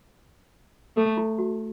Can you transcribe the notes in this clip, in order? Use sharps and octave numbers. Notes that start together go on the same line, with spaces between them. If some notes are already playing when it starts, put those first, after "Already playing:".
A3 A4
E4
F#4